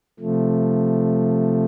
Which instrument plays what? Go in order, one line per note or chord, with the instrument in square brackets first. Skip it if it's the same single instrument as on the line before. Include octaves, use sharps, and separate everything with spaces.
[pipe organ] C3 F3 A3